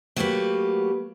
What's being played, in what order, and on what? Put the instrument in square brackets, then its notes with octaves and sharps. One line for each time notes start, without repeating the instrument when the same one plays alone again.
[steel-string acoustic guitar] F#3 A3 A#3 F#4 G4 B4